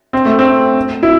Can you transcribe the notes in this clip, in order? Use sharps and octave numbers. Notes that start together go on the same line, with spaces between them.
C4
A3
C4
E4